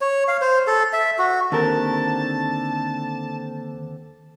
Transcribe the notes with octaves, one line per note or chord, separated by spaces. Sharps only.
C#5
F5
C5
A4
E5
F#4
D#2 D3 C4 A4 A#4 A5